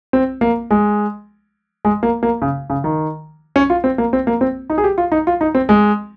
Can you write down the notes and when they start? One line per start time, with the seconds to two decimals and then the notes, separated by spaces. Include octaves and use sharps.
0.13 C4
0.41 A#3
0.71 G#3
1.85 G#3
2.03 A#3
2.23 A#3
2.42 C#3
2.70 C#3
2.84 D#3
3.56 C#4
3.70 F4
3.84 C4
3.98 A#3
4.13 C4
4.27 A#3
4.41 C4
4.70 D#4
4.78 G#4
4.84 G4
4.98 F4
5.12 D#4
5.27 F4
5.41 D#4
5.55 C4
5.69 G#3